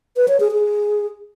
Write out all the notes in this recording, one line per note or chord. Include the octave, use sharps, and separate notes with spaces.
B4
C#5
G#4
G#4